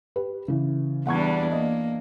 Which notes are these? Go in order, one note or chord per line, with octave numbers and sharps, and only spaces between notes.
G4 B4
C#3 E3
E2 G3 D4 F#5 C#6 G#6
A#3 D#5